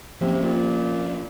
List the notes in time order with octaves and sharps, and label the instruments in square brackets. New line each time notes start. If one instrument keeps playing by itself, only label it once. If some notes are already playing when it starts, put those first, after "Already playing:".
[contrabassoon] C3 [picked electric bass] F3 A#3 C#4
[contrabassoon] A#2